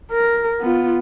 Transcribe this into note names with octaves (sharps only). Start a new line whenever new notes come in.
A#4
B3 F4